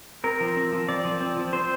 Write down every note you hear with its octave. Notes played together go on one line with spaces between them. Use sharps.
C4 A#4
F3
C4
F3
C4 D5
F3
C4
F3
C4 C5